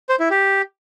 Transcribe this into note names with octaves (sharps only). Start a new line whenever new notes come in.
C5
E4
G4